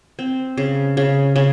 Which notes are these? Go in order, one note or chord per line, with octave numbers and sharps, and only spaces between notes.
C4
C#3
C#3
C#3